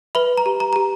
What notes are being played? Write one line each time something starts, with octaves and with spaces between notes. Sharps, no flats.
B4 E5 B5
A#5
G4
A#5
G4 A#5